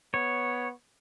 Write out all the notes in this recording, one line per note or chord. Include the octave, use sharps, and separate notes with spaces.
B3 C#5